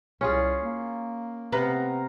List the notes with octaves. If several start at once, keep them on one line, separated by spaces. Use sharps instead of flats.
C2 C#4 F4 G#4
A#3
C3 B3 F5 A#5